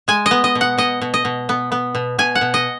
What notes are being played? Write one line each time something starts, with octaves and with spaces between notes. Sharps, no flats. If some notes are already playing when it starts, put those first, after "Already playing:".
G#3 G#5
D#5
B3
D#5
B2
F#5
B2 D#5
B2
D#5
B2
B3
B3
B2
B2 G#5
F#5
B2
D#5